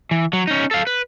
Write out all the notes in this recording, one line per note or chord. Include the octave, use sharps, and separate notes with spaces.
E3
F#3
C#4 D#4
A4 F5
B4